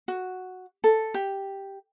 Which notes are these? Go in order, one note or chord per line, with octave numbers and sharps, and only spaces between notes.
F#4
A4
G4